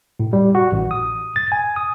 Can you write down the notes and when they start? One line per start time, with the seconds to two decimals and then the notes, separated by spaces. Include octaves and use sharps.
0.20 A2
0.33 G3
0.55 F#4
0.72 A1
0.91 D#6
1.36 A6
1.52 G#5
1.76 D#6